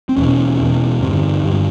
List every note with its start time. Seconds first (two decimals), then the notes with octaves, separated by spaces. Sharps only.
0.09 C4
0.17 E2 B2 C#4
0.60 E2 B2
1.01 G2 D3 C4
1.44 G2
1.49 D3